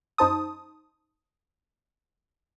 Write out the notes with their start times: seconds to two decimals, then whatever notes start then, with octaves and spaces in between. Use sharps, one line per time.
0.18 F#2 D#4 C5 A5 D#6